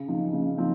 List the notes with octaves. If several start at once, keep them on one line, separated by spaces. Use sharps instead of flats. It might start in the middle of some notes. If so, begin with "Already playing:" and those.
Already playing: C#3
F3 C4 D#4
C#3
F3 C4 D#4